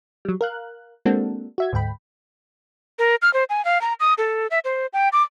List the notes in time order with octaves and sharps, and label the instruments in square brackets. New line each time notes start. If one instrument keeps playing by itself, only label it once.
[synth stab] F#3 G3
A#4 F5 F#6
G#3 A#3 C4 D4 F#4 A4
F#4 E5 G#6
D2 G#2 G5 B5
[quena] A#4
F6
C5
G#5
F5
A#5
D#6
A4
E5
C5
G5
D6